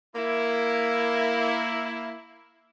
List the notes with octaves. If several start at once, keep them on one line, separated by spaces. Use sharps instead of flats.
A#3 E4